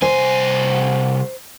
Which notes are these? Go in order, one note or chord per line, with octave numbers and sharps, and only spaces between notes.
C2 C5 G#5